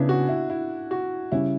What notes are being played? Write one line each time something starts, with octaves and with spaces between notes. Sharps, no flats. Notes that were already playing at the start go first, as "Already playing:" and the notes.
Already playing: C#3 B3 D4 E4
F#4
E4
E4
F#4
C#3 G3 C#4 E4